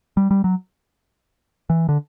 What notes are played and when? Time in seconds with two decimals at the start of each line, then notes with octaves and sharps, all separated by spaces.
0.17 G3
0.31 G3
0.44 F#3
1.70 E3
1.89 D3